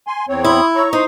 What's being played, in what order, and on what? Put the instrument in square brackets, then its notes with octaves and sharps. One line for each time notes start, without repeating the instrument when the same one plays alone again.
[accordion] G#5 C6
E2 C4 C#5
[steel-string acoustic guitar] E4 [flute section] B5 C6 D#6
[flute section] C#5 E6 [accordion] A#5 C#6
[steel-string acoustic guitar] D#4 [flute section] C5 D#6